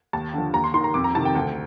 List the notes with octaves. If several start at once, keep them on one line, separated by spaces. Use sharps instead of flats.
D#2 A5
D3 F3
D#2 A#5
C6
D#3 C6
A#5
F2 D6
A#5
C3 D#3 A5
G5
D2